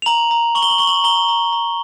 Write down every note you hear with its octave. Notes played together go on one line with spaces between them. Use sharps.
F7
A#5 F#7
A#5
C#6 F#7
G7
F#7
C#6 G7
F#7
A#5 G7
A#5
A#5